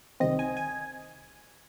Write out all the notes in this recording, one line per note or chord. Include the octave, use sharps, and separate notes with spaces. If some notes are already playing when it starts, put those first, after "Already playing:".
C2 C3 D#3 C4 D#5
G#5
G#5